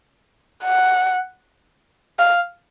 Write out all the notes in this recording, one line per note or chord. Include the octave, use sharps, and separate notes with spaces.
F#5
F5